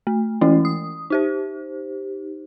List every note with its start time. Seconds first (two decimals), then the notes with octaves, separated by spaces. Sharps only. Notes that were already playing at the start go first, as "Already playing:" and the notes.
0.07 A3
0.41 E3 G#3 A3 C#4 E4
0.65 D#6
1.10 D#4 G4 C5